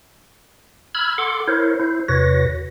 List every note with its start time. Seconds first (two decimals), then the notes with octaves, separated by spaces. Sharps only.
0.95 B5 E6 F6 G#6
1.18 A4 F#5 C6 D6
1.47 E4 A#4 C5 C#5
1.80 E4 C5
2.08 E2 C3 F#4 B4 C#5 A#6